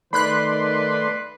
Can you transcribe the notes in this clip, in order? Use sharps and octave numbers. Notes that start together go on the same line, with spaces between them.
D#3 A3 B4 D5 B5 C6 F#6